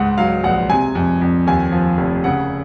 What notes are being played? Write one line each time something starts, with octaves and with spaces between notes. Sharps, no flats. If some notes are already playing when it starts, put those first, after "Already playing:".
Already playing: C#2 G#2 F#5
F#3 F5
A#1 F#5
C3 G#5
F2
F2
D#2 G#5
F3
F1
C#3 F#5